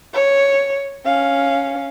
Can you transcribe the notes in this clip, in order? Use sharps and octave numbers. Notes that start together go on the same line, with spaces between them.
C#5
C#4 F5